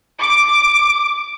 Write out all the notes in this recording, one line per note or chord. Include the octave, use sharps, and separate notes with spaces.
D6